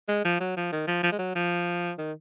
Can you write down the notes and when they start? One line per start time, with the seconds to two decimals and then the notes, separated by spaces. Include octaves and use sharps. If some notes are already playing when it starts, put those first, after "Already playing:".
0.09 G#3
0.25 F3
0.40 F#3
0.57 F3
0.73 D#3
0.88 F3
1.03 F3
1.12 G#3
1.19 F#3
1.36 F3
1.98 D#3